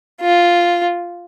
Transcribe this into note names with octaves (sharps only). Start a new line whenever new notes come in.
F4